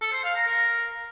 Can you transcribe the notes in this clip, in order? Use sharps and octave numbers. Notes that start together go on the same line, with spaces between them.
A4
C5
F5
A#5
A#4